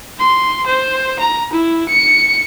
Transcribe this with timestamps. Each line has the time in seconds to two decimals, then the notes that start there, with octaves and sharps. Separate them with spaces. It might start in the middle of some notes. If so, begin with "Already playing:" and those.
0.19 C6
0.67 C5
1.19 A#5
1.53 E4
1.89 C#7